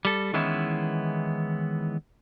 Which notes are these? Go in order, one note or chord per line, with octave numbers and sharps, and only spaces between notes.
G3 A4
D#3 E3 G#3 B3 C#4 E4